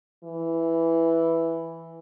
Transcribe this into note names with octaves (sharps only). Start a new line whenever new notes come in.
E3